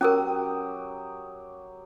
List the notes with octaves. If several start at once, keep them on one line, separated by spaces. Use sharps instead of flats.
F#3 C#4 G4 A#4 D#6